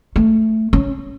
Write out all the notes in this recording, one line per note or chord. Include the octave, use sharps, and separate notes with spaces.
A3
C#4